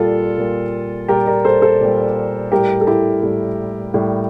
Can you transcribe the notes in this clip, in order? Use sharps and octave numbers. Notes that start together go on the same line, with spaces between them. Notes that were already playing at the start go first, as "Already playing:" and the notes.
Already playing: A#2 G3 F4 A4
A#2 G3
A#2 G3 G4 A#4
A#4 D5
A4 C5
A4 C5
A#2 G3
A2 G3 G4 A#4
A4
E4 G4
A2 G3
A2 G3